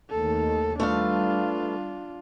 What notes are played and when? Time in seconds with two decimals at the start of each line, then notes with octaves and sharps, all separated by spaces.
0.10 D#2 D#3 A3 A4
0.80 G3 A3 D4 F4 B4 F5